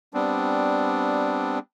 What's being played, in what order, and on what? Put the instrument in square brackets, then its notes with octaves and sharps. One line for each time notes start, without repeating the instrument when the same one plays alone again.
[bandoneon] G3 B3 C4 D4